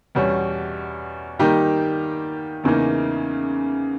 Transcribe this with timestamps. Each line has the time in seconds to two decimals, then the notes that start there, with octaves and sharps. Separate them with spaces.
0.15 E2 B2 G3 C#4
1.39 D#3 G3 A#3 D#4 G4
2.64 E2 C#3 E3 A#3 D#4